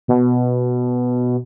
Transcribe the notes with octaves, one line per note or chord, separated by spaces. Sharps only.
B2